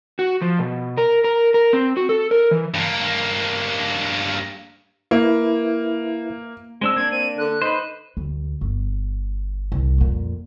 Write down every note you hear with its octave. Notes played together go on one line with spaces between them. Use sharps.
F#4
F3
B2
A#4
A#4
A#4
C4
F#4
A4
A#4
E3
G2 A#3
A#3 E4 B4 E5
G#3 C4 D4 E6
A#3 D4 G#6
C4 D#7
D3 F#6
D#4 B4 C5
D2
G1
C2
F2 A#2